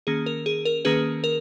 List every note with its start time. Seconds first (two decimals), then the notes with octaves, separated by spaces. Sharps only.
0.07 D#3 A#3 C#4 G#4
0.26 A#4
0.46 G#4
0.65 A#4
0.85 D#3 A#3 C#4 G#4 B4
1.24 A#4